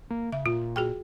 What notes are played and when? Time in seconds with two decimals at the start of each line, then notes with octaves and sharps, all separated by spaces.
0.10 A#3
0.32 C#3 E5
0.46 A#2 F4
0.76 F#4 G#4 G5